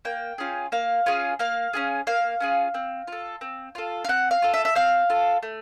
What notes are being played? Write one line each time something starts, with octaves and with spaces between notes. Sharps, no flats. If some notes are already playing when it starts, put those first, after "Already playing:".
A#3 G5
C#4 F4 G#4
A#3 F5
C#4 F4 G#4
A#3 F5
C#4 F4 G#4
A#3 F5
C#4 F4 G#4
C4
F4 A4
C4
F4 A4
F5
C4 F#5
F5
F4 A4
E5
E5
C4 F5
F4 A4
A3